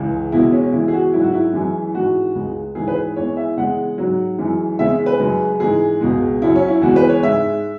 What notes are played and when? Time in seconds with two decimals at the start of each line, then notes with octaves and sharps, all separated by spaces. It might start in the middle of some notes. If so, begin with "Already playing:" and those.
Already playing: C#2 C#3 E3 G#3
0.32 E2 B2 G#3 E4
0.52 C#4
0.72 E2 C#3 E3 G#3 E4
0.88 G#4
0.93 F#4
1.13 G#2 F#3 E4
1.24 F#4
1.34 E4
1.53 F#2 E3 G#3
1.94 G#2 E3 G#3 F#4
2.35 C#2 C#3 G#3
2.75 G#2 E3 G#3 G#4
2.88 B4
2.96 G#4
3.16 E2 E3 G#3 C#5
3.37 E5
3.57 E2 C#3 G#3 F#5
3.98 G#2 F#3
4.38 F#2 E3 G#3
4.79 E2 C#3 G#3 E5
5.06 B4
5.19 F#2 C#3 G#3
5.60 G#2 E3 G#3 G#4
6.01 C#2 B2 G#3
6.42 F#2 F#3 E4
6.56 C#4
6.68 E4
6.82 E2 C#3 E3 G#3 F#4
6.96 B4
7.09 C#5
7.23 G#2 G#3 E5